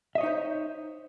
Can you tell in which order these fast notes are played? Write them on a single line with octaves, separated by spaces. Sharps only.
E5 D#5 C#5 D#4 C5